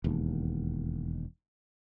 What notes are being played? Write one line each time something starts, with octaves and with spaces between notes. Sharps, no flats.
E1 D#2